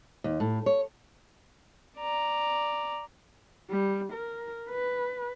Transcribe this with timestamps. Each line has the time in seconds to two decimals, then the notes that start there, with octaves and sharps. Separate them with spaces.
0.24 D#2
0.40 A2
0.66 C#5
1.98 D5 A#5
3.70 G3
4.13 A#4
4.70 B4